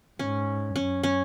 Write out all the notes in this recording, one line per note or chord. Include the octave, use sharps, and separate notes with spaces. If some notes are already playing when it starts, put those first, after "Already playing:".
G#2 C#4
F#2 C#4
C#4